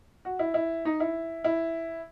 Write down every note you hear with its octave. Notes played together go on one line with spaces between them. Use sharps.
F#4
E4
E4
D#4
E4
E4